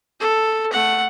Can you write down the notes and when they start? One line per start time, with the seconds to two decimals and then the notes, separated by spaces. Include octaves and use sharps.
0.20 A4
0.73 A3 F#5